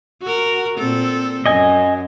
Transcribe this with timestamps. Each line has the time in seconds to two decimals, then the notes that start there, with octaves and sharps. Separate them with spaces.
0.23 F#4 A#4
0.78 A#2 C4 A4
1.46 F#2 D#5 G#5